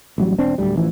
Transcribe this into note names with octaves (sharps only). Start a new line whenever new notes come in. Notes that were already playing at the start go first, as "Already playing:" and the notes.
A1 F#3 G3
E1 C4 D4
D1 D2 G3
A1 E3 F3